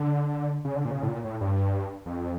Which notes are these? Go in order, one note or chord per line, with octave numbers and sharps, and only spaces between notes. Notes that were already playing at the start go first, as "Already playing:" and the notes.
Already playing: D3
C#3
D3
A#2
C#3
A2
A#2
A2
G2
F2